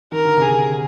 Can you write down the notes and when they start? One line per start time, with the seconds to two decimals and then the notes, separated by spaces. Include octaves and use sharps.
0.12 D#3 A#4
0.25 D3
0.37 C3 G#4
0.50 D3